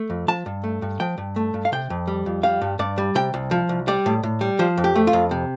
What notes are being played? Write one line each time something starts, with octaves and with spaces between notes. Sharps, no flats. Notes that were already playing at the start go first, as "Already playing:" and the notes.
Already playing: A3
F2
F3 A5
G2
A3
G2
F3 G5
G2
A3
G2
F5
C3 G5
F2
G3
F2
G3 F5
G2
G2 D5
G3
C3 G5
C2
F3
C2
G3 D5
A2
A2
G3
F3 C5
F2
G4
A3
F4
F2
C3